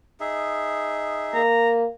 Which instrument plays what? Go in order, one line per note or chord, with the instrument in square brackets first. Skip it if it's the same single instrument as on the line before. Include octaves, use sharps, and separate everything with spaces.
[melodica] D#4 G#4 E5
[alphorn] A#3 [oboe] A#5